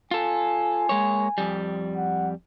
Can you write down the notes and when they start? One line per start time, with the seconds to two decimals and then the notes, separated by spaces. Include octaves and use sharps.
0.11 F4 A4 G#5
0.89 G#3 A#3 C#5
1.38 F2 G3
1.96 F#5